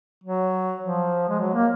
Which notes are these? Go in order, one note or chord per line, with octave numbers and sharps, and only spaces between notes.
F#3
F3
G#3
F#3
A#3